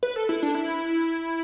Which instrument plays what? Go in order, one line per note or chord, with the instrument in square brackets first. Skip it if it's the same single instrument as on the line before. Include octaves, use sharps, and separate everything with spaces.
[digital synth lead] B4
A4
E4
D4
E4